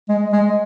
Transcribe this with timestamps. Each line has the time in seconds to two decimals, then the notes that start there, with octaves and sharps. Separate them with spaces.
0.09 G#3
0.33 G#3